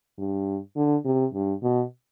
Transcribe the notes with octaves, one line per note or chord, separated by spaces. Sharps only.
G2
D3
C3
G2
B2